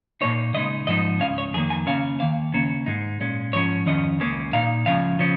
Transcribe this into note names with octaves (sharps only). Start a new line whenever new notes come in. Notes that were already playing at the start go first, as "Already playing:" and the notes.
A#2 A#3 D#4 C#5
C#3 G#3 D#4 D#5
G#2 F3 G#3 D#4 D#5
C#2 C#3 G#3 C#4 F5
C#5
F2 D#3 A#3 G#4
G#5
C#3 A#3 C#4 F5
D#2 D#3 A#3 F5
D#2 C#3 A#3 C#4 C#5
G#2 G#3 D#4
A#2 G#3 C#4
G#2 F3 C#4 C#5
F2 D#3 C#4 D#5
C#2 C#3 A#3 C#4
A#2 A#3 D#4 F5
C#2 C#3 F3 C#4 F5
C#3 F3 C#4